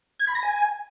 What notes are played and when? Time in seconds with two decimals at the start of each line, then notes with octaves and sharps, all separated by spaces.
0.19 G#6
0.27 B5
0.35 A#6
0.43 G#5